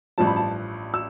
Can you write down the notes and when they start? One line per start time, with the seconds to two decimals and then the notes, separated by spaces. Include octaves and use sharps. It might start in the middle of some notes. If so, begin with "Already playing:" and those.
0.18 A1 G2 F3 A5
0.27 B5
0.36 A5
0.94 E6